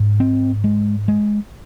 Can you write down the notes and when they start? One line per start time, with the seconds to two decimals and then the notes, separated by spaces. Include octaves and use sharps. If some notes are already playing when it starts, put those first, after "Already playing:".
Already playing: G#2
0.20 C4
0.64 G#3
1.08 G#3